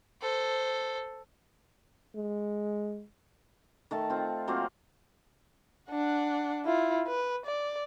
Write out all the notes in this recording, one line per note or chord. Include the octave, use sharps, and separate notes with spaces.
A4 C5
G#3
D#3 A3 A5
C4 F4
F#3 A#3 C4 F4
D4 F#5
E4 F4
B4
D5